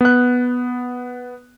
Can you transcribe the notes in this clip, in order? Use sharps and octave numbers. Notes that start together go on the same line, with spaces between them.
B3 F#6